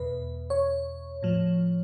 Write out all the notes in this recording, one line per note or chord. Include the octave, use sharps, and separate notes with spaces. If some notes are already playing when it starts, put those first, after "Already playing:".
Already playing: E2 B2 B4
C#5
A2 F3